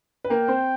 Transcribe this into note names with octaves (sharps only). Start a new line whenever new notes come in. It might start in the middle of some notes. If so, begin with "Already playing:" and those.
B4
A#3 A#4 G5
C4 C5